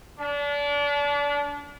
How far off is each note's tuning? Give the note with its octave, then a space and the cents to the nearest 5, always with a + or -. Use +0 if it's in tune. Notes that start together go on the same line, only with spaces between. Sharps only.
D4 -30